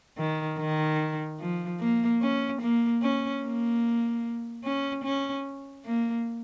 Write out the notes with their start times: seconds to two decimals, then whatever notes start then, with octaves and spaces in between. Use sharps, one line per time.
0.18 D#3
0.59 D#3
1.40 F3
1.80 A#3
2.21 C#4
2.62 A#3
3.02 C#4
3.43 A#3
4.64 C#4
5.04 C#4
5.85 A#3